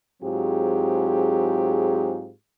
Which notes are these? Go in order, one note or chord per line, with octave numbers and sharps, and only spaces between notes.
G#2 F#3 C4 F4 G4 G#4